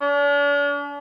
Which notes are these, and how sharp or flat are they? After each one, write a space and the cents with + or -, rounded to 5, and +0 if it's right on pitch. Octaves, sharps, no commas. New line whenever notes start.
D4 -45